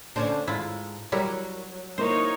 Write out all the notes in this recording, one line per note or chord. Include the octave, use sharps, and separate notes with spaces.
D3 C#4 D4 C5 A5
G#2 E4 F4
F#3 G3 E4 A#4
A#3 D#4 E4 A#4 C5 C#5